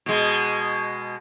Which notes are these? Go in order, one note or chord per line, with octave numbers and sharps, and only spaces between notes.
B2 G#3